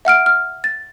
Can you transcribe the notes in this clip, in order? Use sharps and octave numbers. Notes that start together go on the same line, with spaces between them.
E5 F#5 F6 D7
F6
A6